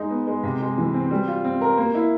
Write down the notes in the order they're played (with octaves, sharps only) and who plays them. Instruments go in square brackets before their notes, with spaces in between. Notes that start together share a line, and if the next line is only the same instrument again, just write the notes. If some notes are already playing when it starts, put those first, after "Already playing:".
Already playing: [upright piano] G#3 D#4
B3
G#3
C3
G#3
E3
C4
G3
F4
C4
A#4
A#3
E4